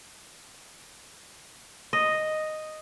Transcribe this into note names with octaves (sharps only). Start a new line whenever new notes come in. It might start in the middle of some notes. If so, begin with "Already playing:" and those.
D#5